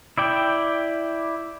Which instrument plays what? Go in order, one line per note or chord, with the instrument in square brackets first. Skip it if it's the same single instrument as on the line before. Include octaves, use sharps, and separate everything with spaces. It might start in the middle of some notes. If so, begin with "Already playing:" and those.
[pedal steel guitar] E4 D5 G5